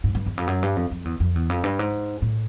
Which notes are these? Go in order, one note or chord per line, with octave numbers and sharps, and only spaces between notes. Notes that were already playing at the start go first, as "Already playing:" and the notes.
G#2
G2
E2
F2
F#2
G2
F2
F2
E2
F2
E2
F2
G2
G#2
A2